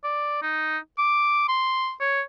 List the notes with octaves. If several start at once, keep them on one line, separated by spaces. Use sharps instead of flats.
D5
D#4
D6
C6
C#5